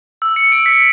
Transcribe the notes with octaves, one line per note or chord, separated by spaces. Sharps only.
E6
C#7
D7
B6